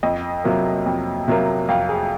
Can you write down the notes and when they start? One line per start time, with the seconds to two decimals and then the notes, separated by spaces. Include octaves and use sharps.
0.03 F2 D#5
0.44 C3 F#3 A#3
0.86 F2
1.28 C3 F#3 A#3
1.69 F2 F5
1.89 G#4